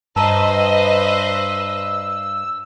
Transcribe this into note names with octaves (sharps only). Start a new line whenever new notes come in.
G2 B4 C5 D#5 A5 A#5 E6